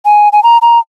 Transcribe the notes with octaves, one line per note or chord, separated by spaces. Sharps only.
G#5
G#5
A#5
A#5